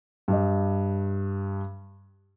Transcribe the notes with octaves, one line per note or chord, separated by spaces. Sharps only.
G2 G4 D#5